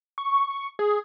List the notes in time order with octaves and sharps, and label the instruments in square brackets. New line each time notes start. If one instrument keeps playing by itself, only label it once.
[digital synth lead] C#6
G#4